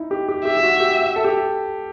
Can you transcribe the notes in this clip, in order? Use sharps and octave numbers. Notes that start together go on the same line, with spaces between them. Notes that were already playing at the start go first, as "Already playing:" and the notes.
Already playing: D#4 E4
G4
G4
G4 E5
G4
F#4
G4
A4
G4